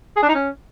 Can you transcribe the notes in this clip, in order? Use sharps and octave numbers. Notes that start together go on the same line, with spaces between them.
G#4
D4
D#4
C#4